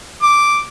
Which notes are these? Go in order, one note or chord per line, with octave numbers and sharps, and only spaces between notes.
D6